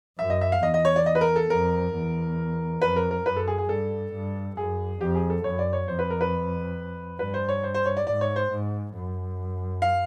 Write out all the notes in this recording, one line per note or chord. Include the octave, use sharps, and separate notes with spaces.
F#2 E5
D#5
E5
F5
E2 D#5
D#5
C#5
D5
D#5
B4
A#4
A4
F2 A#4
E2
F2 B4
A#4
A#4
F#2 B4
A4
G#4
G#4
G2 A4
G2
F#2 G#4
F2 G4
G#4
A4
F#2 C#5
D5
C#5
F2 C5
B4
A#4
B4
G2 B4
C5
C#5
C5
C5
C#5
D5
G#2 D5
C#5
C5
G#2
F#2
F5